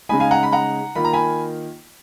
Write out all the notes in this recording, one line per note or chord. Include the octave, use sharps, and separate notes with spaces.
C#3 G#3 D#4 G#5 B5
F5 G#5
F#5 A#5
B5
F#5 A#5
D#3 A#3 F4 B5
A#5
G#5 B5